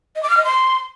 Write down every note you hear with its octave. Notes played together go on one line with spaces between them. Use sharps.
D#5
D6
F6
D#5
C6